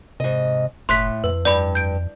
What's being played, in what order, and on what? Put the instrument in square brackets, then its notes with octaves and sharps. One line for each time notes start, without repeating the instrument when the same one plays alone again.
[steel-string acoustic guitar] G#2 D#5 [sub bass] C3
[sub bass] F#1 [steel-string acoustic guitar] A2 [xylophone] C6 F#6 B6
[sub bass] F2 [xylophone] B4
[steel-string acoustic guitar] G2 [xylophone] D5 B5
[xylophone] G6 D7